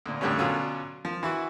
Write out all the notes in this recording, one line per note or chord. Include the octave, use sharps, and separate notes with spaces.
D2 A#2
F2 A2 D3 G3 A3 C#4
B2 D3 F#3 C#4 F4
F3
E3 E4 F#4